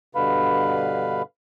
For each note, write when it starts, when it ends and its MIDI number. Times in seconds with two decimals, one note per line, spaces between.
0.15 1.22 43
0.15 1.22 47
0.15 1.22 50
0.15 1.22 71
0.15 1.22 77
0.15 1.22 83